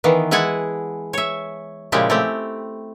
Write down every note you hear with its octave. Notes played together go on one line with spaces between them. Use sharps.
D#3 E3 B3
G#3 E4 G#4 F#5 G#5 A5
C#5 E5
A#2 C#3 F3 G#3 E4 G4
A3 C4 G4